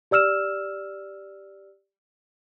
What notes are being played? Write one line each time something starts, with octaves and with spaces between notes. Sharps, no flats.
G4 D5 E6 F6 E7